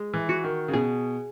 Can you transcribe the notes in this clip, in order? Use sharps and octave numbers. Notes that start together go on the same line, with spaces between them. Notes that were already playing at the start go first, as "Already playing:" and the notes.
Already playing: G#3
E3
F#4
D#3
C#3
B2 G#4